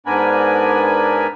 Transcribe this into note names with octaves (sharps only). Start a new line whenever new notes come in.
G#2 B3 D4 A#4 G#5 B5